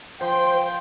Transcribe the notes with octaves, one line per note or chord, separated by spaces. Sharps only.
F3 C5 G5